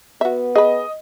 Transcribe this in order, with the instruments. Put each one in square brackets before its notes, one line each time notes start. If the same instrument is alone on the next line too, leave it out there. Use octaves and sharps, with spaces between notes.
[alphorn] B3 [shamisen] F#4 E5
[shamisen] G#4 B4 [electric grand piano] D#5